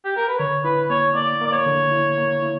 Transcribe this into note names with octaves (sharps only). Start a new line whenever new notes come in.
G4
A#4
B4
D3 C#5
E4 B4
A#3 C#5
A#3 D5
A#3
D5
C#5
D3
E4
A#3
E4